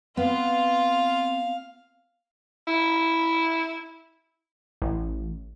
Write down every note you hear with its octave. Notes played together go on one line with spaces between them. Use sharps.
B3 C4 F4 F5
E4
A1